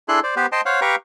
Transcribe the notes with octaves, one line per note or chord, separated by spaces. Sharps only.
D4 E4 G#4 A4 C6 F#6
C5 D5
B3 G4 B4 C5
C5 D#5 G5 A5 C6
C5 C#5 F5 F#5
G4 B4 F5 G5 A#5 C#6